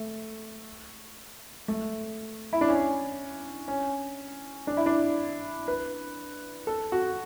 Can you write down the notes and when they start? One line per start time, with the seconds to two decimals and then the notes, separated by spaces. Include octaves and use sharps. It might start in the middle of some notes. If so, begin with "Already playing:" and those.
Already playing: A3
1.68 A3
2.53 E4
2.61 D4
2.69 C#4
3.68 C#4
4.67 D4
4.77 E4
4.86 D4
5.68 B4
6.67 A4
6.92 F#4